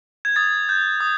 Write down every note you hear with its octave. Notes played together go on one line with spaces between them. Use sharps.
G#6
D#6 A6
G6
D#6